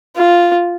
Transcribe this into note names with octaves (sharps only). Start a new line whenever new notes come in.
F4